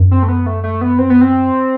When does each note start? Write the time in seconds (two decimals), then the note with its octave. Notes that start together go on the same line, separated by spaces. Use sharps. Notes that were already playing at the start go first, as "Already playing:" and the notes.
Already playing: F#2
0.11 C4
0.23 A3
0.28 B3
0.46 A3
0.63 A3
0.81 B3
0.98 C4
1.10 B3
1.21 C4